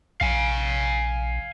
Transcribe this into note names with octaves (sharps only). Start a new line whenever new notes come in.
A#1 F5 G#5